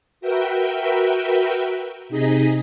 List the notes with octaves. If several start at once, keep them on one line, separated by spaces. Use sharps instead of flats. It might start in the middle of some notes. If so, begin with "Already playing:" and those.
F#4 A#4 B4 E5 G5
C3 D#4 G#4 D#5 B6